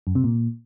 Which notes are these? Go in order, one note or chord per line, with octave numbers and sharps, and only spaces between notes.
F#2
C3
A#2